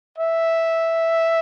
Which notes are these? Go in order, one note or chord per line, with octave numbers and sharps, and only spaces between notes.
E5